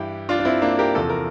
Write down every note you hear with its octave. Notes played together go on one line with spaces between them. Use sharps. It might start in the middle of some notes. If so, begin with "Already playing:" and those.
Already playing: G2 E3 E4 G4
D4 F4
D4
C4 E4
A#3 D4
G4 A#4
E2 C3 F3 A4
A#4